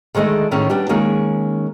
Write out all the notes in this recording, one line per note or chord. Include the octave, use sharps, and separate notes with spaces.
D3 D#3 G#3 A3 D#5
A2 D#3 C#4
G3 B3 D4
D#3 G#3 A#3 C#4 D#4